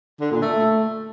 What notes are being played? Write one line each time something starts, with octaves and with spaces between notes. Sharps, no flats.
D3
A#2
A3